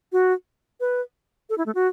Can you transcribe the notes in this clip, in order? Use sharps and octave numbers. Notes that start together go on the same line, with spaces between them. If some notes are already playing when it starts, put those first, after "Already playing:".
F#4
B4
A4
E4
A3
F#4